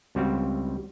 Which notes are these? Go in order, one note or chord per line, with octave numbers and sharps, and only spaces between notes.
C#2 G3 C4 F#4 F5